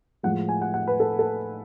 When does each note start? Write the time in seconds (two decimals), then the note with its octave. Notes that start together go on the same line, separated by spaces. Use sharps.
0.23 A2 F3 G#3 F#5
0.49 G#5
0.62 F#5
0.74 F#5
0.87 B4
1.00 A4
1.19 A4